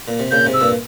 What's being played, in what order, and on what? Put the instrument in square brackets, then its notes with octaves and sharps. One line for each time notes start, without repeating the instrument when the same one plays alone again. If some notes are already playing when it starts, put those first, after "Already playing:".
[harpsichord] A#2
C3
[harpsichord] A#2 C#3 [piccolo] G6
[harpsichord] G#2 C3
[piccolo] E6
[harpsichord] G2 A#2